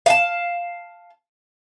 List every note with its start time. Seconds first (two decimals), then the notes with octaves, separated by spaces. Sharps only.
0.06 F5 F#5 A5